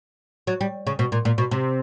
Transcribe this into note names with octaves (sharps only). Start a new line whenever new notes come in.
F#3
G3
C#3
B2
A#2
A#2
B2
C3